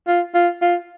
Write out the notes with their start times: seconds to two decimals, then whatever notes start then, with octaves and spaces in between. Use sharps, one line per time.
0.07 F4
0.34 F4
0.61 F4